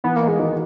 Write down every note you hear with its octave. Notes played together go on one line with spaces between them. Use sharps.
E3 B3
A#3
D#4
G#3
D#3 F#4